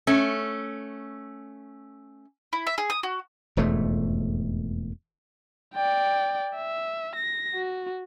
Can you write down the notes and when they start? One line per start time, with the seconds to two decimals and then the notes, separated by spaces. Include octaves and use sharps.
0.07 A3 C#4
2.53 E4
2.67 E5
2.78 G#4
2.90 D#6
3.03 F#4
3.57 E1 F2 G#2 A3
5.74 D5 G5
6.56 E5
7.16 A#6
7.54 F#4